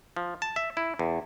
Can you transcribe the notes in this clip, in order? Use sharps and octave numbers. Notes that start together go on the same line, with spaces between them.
F3
A5
E5
E4
E2